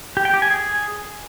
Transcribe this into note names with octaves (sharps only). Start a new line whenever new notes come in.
G4
G5
G4
G#5
G#4